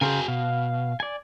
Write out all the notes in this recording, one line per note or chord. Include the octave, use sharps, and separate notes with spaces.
C#3 F#4 G#4 A#4 C5 G#5
B2 F5
D5 G#5